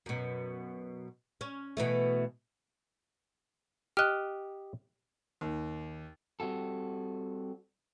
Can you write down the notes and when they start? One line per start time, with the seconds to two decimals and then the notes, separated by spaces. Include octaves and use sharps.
0.06 F#2 B2
1.41 C#4
1.77 B2 E3 A3
3.97 G4 D#5 F6 F#6
5.41 D#2
6.40 G3 C4 F#4 A4